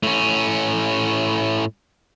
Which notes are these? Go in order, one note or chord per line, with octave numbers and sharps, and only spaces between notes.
A2 C#4